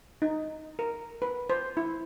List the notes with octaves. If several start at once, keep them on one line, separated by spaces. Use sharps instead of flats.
D#4
A#4
B4
C5
E4